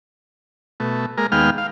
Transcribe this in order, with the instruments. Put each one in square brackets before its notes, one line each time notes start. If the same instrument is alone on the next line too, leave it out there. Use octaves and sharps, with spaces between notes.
[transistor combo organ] B2 A3
G#3 A#3 A#4
D#2 G#3 B3 F5 G5 F6
F5